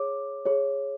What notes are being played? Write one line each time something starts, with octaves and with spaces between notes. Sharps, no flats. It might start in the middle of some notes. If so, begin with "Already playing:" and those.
Already playing: G#4 C#5 D6
G#4 C#5